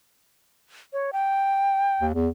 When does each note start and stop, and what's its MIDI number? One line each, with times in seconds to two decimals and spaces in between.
0.93 1.11 73
1.13 2.06 79
2.00 2.14 39
2.14 2.28 40